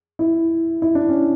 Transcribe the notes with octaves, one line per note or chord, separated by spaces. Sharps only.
E4
E4
D4
C#4